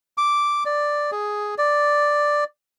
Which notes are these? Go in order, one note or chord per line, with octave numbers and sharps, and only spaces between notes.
D6
D5
G#4
D5